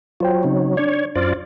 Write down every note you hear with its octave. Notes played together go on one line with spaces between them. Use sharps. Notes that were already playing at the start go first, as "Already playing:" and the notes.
F#3 F4 C5 G5
C#3 C4 D#4
D4 C#5 D5
F#2 F4 C5 D5